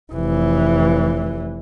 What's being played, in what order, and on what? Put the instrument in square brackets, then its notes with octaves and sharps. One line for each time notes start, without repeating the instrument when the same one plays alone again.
[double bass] F1 E3